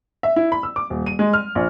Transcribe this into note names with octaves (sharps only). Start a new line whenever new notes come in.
E5
E4
B5
E6
D6
D#1
D#7
G#3
F6
A#1